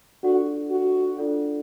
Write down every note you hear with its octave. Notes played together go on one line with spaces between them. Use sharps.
D4 F4 F#4 A4 D5 F#5
F#4
D4 F4 A4 D5 F#5